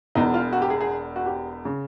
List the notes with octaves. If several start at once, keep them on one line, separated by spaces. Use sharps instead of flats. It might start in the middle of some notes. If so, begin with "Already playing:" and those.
E1 E2 B2 D#4
F4
F#4
G4
G#4
G#4
F#4
G4
C#3